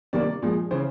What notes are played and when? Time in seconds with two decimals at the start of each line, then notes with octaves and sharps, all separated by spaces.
0.13 C3 D#3 G3 A#3 D4 D5
0.42 A#2 F3 G#3
0.71 C#3 E3 C5